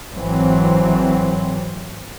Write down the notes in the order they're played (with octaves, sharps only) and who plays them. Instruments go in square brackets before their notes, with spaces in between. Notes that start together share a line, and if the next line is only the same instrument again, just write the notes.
[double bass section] G#1 E3 F#3 C4